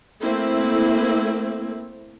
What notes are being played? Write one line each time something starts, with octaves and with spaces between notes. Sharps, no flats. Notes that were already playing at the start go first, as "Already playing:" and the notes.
A3 A#3 C4 E4